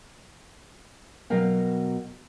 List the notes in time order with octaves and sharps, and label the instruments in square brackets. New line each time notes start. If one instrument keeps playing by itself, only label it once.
[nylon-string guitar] B2 F#3 F#4 A#4 F5 G5